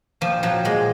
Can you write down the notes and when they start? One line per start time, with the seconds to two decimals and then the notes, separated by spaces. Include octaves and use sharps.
0.21 A#2 F3
0.43 F3 F#3
0.65 A#2 G#3